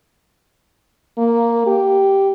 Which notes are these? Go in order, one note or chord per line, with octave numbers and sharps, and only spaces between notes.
A#3
G4